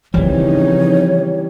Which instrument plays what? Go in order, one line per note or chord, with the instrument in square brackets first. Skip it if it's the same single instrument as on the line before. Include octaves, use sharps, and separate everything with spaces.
[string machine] C#3 D#4 [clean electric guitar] E3 G3 [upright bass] F3 C4 [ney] C#5